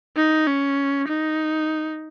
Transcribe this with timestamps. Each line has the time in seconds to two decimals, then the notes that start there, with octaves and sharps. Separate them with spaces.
0.17 D#4
0.47 C#4
1.08 D#4